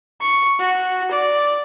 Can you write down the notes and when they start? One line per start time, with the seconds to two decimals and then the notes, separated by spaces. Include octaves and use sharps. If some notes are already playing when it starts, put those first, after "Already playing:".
0.22 C#6
0.60 F#4
1.11 D5